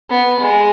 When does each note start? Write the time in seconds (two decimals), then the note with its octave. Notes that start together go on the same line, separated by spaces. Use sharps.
0.10 B3
0.40 G#3